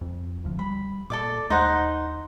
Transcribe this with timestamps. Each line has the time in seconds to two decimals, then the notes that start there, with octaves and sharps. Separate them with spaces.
0.01 F2
0.44 D1 D2 F3
0.59 G3 B5
1.10 A#2 A4 D5 D6
1.50 D#2 D#4 C5 F#5